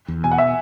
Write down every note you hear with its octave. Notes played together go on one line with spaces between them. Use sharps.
E2
B2 G#5
F#5
E5